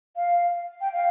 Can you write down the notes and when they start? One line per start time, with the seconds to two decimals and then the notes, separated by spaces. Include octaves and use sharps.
0.16 F5
0.81 G5
0.92 F5